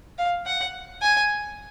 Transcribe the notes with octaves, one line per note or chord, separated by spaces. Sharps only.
F5
F#5
G#5